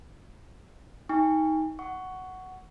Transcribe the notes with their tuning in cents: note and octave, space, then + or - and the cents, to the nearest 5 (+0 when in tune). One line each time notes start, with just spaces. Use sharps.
D#4 +20 G#5 -45 C#6 +15
F#5 +5 C#6 +10